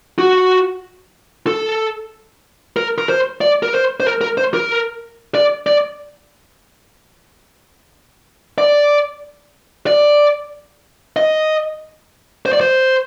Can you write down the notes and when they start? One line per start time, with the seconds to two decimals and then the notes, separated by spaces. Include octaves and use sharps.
0.19 F#4
1.47 A4
2.77 A#4
2.98 A#4
3.09 C5
3.41 D5
3.63 A#4
3.73 C5
4.00 C5
4.06 A#4
4.21 A#4
4.38 C5
4.54 A#4
5.35 D5
5.67 D5
8.58 D5
9.87 D5
11.16 D#5
12.46 C5
12.53 D5
12.61 C5